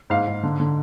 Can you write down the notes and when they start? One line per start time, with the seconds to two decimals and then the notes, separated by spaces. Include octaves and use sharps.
0.10 G#2 F5
0.27 G#2
0.43 D3
0.60 D3